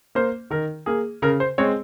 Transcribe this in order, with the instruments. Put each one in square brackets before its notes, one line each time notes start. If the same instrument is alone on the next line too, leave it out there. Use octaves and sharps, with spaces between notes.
[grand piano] A#3 C5
D#3 A#4
A#3 G#4
C#3 A#4
C5
G#3 C4 C#5